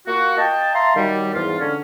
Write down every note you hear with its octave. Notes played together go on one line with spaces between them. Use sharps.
A#3 F4 F#4
D#5 F5 G5 A5
E5 F5 A5 A#5 C6
D#3 F#3 G3
E2 G#2 F4
D3 C#4